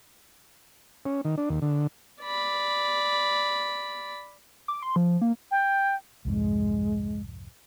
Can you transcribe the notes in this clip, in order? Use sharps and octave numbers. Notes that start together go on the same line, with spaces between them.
C#4
D#3
D4
D#2
D3
D5 B5
D6
C6
F3
A#3
G5
C2 F2 G#2 G#3